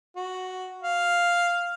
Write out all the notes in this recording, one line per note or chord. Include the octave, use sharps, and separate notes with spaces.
F#4
F5